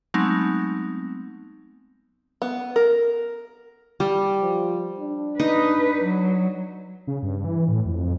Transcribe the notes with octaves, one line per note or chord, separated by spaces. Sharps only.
F#3 G#3 A3 B3 C4 D#4
B3
A#4
G3
F3
D4
D#4 B4
F#3
C#3
G2
E3
A2
F2